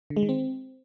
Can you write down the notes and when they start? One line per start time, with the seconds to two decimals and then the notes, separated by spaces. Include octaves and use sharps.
0.10 D3
0.17 G#3
0.23 D#3
0.29 C4